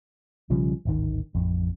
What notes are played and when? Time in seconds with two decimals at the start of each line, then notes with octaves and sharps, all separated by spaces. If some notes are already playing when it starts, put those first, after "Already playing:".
0.50 B1 C#3 F3 G3
0.85 D1 G#1 D#3
1.34 A1 F2